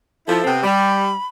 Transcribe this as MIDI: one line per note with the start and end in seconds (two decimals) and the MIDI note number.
0.27 0.40 53
0.27 0.40 64
0.27 0.49 69
0.44 0.61 48
0.44 0.61 59
0.44 0.61 60
0.63 1.12 55
0.63 1.27 83